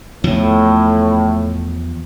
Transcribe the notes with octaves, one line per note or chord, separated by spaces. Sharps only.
E2 A2 F3